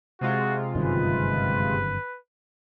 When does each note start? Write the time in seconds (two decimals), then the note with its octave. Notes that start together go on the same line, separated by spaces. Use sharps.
0.21 C3 G#3 F4 F#4
0.75 G1 F#2 D#3 B4